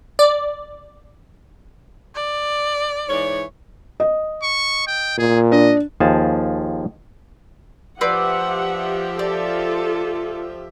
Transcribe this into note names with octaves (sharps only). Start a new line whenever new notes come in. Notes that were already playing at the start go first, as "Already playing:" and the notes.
D5
D5
G#2 E3 C#5
D#5
C#6
G5
A#2 G#4
D4 D#5
D#2 F3 G#4 A5
F3 C4 G4 B4 D5 E5 F#5
F4 A4 D5